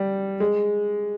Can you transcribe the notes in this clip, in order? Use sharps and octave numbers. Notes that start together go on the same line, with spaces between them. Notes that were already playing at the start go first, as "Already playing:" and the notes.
Already playing: G3
G#3